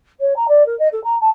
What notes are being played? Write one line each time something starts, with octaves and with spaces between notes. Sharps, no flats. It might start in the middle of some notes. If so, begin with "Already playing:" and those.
C#5
A#5
D5
A#4
D#5
A4
A#5
A5